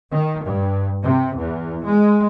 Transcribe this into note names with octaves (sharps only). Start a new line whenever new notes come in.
D#3
G2
C3
E2
G#3